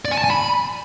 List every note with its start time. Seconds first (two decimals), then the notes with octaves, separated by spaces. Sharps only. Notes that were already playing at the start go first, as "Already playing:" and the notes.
0.05 D5
0.11 G#5
0.18 A5
0.24 G#5
0.30 B5